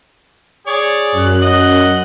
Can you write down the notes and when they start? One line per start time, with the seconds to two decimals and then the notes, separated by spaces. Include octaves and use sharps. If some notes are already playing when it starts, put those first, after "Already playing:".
0.67 G#4 C#5 D5
1.12 F#2 F#6
1.42 D#5 F#5